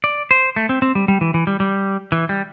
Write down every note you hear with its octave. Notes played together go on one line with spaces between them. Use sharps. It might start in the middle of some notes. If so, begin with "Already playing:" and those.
D5
C5
A3
C4
C4
G3
G3
E3
E3
G3
G3
E3
G3